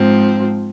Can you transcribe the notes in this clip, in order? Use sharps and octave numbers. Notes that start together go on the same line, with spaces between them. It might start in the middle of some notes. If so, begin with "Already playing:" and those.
Already playing: G#2 F3 C4